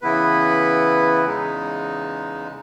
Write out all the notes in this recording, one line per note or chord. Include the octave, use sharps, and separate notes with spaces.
C#3 E3 B3 E4 B4
E2 C#3 G#3 D#4